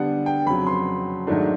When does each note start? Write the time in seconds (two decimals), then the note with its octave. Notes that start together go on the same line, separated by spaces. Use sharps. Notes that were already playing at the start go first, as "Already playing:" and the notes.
Already playing: D3 G3 B3 D4 F#5
0.26 G5
0.46 F2 C#3 F#3 B5
0.67 C6
1.27 G#2 D#3 F#3 A3 D4